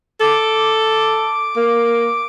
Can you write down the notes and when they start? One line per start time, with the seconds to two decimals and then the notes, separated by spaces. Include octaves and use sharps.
0.20 A4 D6
1.56 A#3